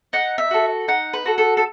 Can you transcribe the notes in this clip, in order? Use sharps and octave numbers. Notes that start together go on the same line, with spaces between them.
D#4 F#5
E5
F#4 A4
D#4 F#5
B4
F#4 A4
A4
A4